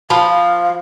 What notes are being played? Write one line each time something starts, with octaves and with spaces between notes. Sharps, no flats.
F3 F5 A5 B5